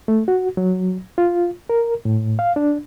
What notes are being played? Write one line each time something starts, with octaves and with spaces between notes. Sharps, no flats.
A3
F#4
F#3
F4
A#4
A2
F5
D4